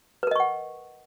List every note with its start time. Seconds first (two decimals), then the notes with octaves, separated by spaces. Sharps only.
0.23 B4
0.27 A#4
0.31 D#5
0.36 C#6
0.40 F#5